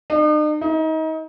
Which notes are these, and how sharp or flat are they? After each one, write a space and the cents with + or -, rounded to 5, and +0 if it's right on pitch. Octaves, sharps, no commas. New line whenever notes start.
D#4 -45
D#4 +30